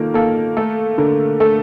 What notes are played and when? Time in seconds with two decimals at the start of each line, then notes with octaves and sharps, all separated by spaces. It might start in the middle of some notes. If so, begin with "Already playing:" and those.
Already playing: D#3 A#3 F4 A4
0.14 A#3 A4
0.57 A3 A4
0.98 D3 A#4
1.40 A3 A4